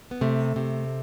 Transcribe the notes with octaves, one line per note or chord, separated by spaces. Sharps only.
B3
C3 A3
C3